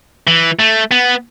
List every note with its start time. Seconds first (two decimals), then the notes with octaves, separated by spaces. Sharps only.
0.27 E3
0.59 A3
0.91 B3